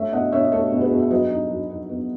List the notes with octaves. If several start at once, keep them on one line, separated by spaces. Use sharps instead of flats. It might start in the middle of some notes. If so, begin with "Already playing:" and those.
Already playing: A3 C#5 E5
B2 D#5 F#5
B2 C#5 E5
D#5
A3 A4 C#5
B2
G#4 B4
B2
E5
F#3 B4 D#5
D#4
F#3
D#4
B3